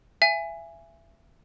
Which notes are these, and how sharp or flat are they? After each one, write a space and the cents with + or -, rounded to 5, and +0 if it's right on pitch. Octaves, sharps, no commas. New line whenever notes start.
E5 +25 G#5 -5